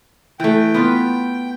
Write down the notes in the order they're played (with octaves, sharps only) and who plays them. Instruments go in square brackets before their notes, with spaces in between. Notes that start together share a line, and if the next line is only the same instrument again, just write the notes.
[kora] E3 A3 [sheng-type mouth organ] G5
[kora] B3 F4 B4